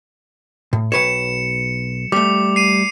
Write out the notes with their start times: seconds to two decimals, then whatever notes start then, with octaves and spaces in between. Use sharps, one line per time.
0.73 A2
0.92 B1 B4 C#5 C#7 E7
2.12 G3 A3 D6
2.56 C7 D#7